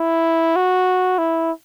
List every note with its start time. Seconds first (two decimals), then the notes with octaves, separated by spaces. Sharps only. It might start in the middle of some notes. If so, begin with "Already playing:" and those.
Already playing: E4
0.56 F#4
1.18 E4